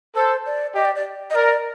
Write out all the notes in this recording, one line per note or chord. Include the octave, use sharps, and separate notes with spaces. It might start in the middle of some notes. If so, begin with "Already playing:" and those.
A4 C5
D5
G4 D#5
D5
D5
D#5
A#4 D5